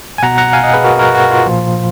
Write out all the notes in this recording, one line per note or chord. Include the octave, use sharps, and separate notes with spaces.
G#5
B2 F#5 A#5
F#5 A#5
F5 G#5
D#5 F#5
G#4 B4
F#4 A#4
F#4 A#4
F#4
F4
A#2 F3